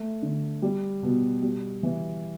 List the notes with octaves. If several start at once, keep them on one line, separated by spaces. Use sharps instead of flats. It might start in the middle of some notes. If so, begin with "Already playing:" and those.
Already playing: A3
D3
G3
B2
G3
E3